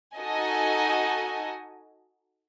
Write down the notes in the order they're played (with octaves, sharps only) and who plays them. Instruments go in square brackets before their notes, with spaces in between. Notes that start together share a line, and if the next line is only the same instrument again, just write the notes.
[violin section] D#4 F#4 A4 D#5 G#5